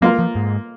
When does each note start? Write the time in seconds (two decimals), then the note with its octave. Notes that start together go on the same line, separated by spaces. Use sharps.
0.02 F#3 A#3 F4 A#4
0.19 F3
0.35 G#2